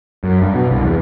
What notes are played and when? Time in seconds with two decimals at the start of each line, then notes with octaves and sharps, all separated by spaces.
0.24 F#2
0.42 G2
0.55 B2
0.71 C2
0.84 E2